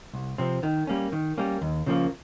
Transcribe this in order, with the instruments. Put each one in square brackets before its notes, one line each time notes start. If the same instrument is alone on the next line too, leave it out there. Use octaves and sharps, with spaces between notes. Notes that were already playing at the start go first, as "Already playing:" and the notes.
[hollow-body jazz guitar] C2
C3 F3 C4
D#3
G3 A#3 C#4
D#3
G3 A#3 C#4
D#2
C#3 F3 A#3